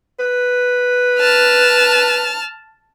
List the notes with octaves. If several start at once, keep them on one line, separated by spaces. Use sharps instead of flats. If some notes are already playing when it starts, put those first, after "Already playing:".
B4
A5 F6